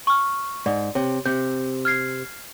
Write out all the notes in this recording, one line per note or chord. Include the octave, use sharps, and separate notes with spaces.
C#6 F6
G#2 D5
C3 C#5
C3 G6
F6 G#6 C7